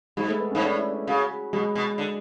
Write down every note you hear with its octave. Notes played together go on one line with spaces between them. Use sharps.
G#2 G#3
A3
B3
G#2 C#4
A2 D4
E4
D4
C#3 F#4
B2 G#3
B2
D3